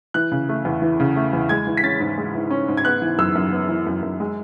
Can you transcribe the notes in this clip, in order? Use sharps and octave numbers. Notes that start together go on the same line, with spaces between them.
E3 F#6
C#3
A3
E2
E3
C#3
A3
E2
G#3 G#6
E3
B6
C#4 A6
G#2
G#3
E3
C#4
G#2
G#6
B3 F#6
E3
F#2 E6
F#2
B3
E3
F#2
F#2
G#3